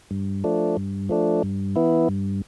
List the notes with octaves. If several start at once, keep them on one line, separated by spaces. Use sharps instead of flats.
G2
F3 A3 D4
G2
F3 A3 D4
G2
E3 B3 E4
G2